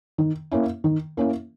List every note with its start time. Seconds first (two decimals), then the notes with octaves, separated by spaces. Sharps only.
0.18 D#3
0.51 A#3 C#4 E4
0.84 D#3
1.17 A#3 C#4 E4